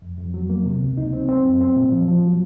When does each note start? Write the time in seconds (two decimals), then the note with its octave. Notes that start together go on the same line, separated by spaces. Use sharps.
0.02 F2
0.18 F2
0.34 F#3
0.50 A#3
0.66 C3
0.81 C#2
0.97 D#4
1.13 C4
1.29 C4
1.45 F#2
1.61 C4
1.76 A#2
1.92 F3
2.08 F3
2.24 F#3